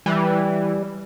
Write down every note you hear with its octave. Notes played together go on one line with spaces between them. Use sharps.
E3 G3